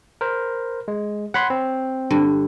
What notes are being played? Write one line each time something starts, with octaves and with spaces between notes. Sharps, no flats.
A#4 C5
G#3
C#5 F#5 B5 C6
C4
G2 D3